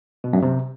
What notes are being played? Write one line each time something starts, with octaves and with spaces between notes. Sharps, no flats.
B2
F#2
C3